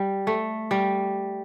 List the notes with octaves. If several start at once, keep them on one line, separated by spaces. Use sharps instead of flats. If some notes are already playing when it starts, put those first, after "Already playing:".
Already playing: G3
A3
G3